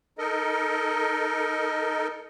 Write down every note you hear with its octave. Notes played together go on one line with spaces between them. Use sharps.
D#4 A4 A#4 D#5